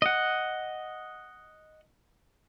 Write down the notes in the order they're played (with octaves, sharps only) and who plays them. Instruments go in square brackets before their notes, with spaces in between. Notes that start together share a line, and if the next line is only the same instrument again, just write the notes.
[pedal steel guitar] D#5 F#5